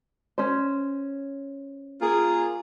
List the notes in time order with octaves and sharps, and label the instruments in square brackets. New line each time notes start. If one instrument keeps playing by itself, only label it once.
[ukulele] C#4 C5
[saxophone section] A#3 F4 G#4